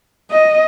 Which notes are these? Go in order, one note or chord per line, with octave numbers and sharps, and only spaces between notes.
D#5